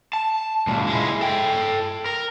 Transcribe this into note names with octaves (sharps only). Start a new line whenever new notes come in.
A5
C#2 A#2
G#3 E4
A4 G5
A#4